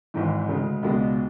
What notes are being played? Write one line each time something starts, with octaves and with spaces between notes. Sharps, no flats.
G#1 G#2 E3
D2 C#3 G#3
C#2 B2 G#3 B3 D4